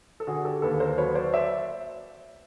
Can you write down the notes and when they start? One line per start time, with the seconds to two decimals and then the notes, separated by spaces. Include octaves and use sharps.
0.20 A4
0.27 D3 F#4 G#4
0.45 G4 A4
0.62 D#2 A4 B4
0.80 A#4 C5
0.98 F#3 B4 C#5
1.15 C5 D5
1.33 D5 E5